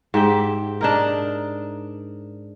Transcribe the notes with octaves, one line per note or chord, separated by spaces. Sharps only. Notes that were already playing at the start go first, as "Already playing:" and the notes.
G#2 G4 E5 G5
D4 D#4 A#4